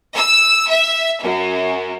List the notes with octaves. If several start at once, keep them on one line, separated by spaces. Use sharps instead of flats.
E6
E5
F#2